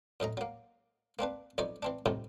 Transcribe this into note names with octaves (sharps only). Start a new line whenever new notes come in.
F#2 A2 D#5 A#5
F#3 A#3
A#3 C4 D4 B4
B1 F2 D#4 C#5 D5
E3 C4 D4
C2 F2 A2 C3 D#3